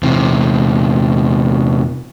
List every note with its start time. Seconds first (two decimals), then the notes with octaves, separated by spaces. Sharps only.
0.03 E2 C3